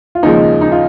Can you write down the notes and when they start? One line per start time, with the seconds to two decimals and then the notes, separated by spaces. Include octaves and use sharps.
0.15 F4
0.23 D#2 C#3 F3 G#3 D#4
0.61 D#4
0.72 F4